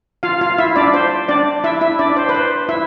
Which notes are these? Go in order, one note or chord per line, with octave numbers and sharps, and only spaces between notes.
F4 F5
F4 F5
E4 E5
D4 D5
C5
D4 D5
E4 E5
E4 E5
D4 D5
C5
B4
C5
E4 E5